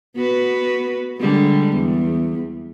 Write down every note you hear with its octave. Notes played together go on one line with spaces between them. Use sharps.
B3 F#4 B4
D3 G3 G#3
E2